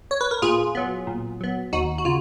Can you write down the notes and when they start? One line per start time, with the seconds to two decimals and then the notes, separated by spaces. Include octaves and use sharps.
0.11 C#5
0.21 B4
0.31 A#4
0.42 A#2 F4 G#4
0.75 F#3 B3
1.07 A#2
1.41 F#3 B3
1.73 D#2 D#4 F#4
1.98 F#4
2.05 C#3 F4